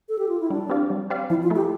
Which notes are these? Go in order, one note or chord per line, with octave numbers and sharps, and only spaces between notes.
A4
G4
F4
E4
G3 D4
C4 G4 D5 F5
G3
C4 G4 D5 F5
F3 E4
F4
A3 E4 A4
G4